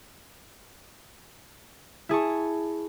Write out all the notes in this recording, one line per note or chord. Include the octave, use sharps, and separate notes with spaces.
E4 G#4 A5 C#6